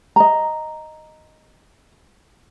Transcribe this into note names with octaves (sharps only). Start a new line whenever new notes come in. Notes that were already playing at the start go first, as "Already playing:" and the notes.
D#5 A#5